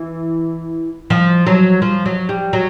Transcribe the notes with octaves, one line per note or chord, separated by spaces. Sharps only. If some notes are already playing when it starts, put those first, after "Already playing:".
Already playing: E3
F3
F#3
F3
F#3
G3
F#3